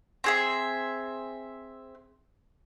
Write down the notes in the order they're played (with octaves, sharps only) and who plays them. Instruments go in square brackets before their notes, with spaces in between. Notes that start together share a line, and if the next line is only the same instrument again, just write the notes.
[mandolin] C4 G#4 E5